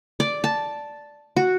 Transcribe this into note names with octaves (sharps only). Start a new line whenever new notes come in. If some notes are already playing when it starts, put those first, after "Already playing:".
D5
A5
F#4